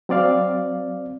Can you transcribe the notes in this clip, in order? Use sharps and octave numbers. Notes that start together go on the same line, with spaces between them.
F#3 C4 D5 F5